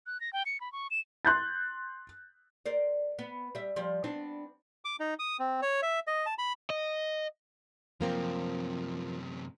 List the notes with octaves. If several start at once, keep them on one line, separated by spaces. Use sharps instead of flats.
F#6
A#6
G5
C#7
B5
C#6
E7
C6 F#6 G6 A6
A#4 C5 D5
B3
G3 E5
F3 G3
B3 C4 D4
D6
D#4
D#6
C4
C#5
E5
D#5
A5
B5
D#5
F#2 C3 F3 A#3 C4